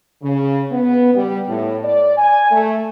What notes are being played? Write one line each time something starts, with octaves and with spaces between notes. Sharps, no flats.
C#3
B3
G3
A2
D5
G#5
A3